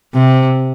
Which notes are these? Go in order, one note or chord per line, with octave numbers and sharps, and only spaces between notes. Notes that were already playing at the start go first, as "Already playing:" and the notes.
C3